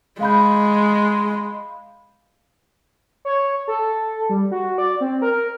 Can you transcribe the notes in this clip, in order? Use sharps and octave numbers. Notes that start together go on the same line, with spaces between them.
G#3 F5 B5 G6
C#5
A4
G3
F#4
D5
C4
A#4